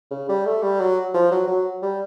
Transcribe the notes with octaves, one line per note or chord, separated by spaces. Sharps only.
C#3
G3
A3
G3
F#3
F3
F#3
F#3
G3